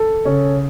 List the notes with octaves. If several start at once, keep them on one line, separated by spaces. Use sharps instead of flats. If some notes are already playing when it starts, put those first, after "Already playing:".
Already playing: A4
C#3 C#4